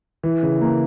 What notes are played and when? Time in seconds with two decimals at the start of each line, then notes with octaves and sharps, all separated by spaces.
0.23 E3
0.43 C#3
0.61 A#3